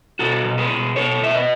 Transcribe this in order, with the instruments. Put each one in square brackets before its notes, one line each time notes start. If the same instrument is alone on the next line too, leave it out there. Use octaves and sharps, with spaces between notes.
[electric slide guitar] B2 F#4 A4
B2
G#4 B4
B2
B2 A4 C#5
B2 E5
B4 D#5